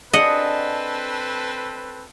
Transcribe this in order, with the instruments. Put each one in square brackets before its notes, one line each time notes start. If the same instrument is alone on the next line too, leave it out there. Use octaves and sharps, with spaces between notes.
[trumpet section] C4 A4 B4 [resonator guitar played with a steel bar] D4 G#4 [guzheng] D#5 F#5